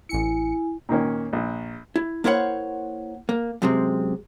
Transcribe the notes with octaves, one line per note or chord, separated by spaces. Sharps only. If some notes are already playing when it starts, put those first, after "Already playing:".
A1 E4 G#5 C#7
A#2 D#3 A#3 C#4
A#1
E4
A#3 E4 A#4 C5 C#5 F#5
A#3
F#2 C3 G#3 C4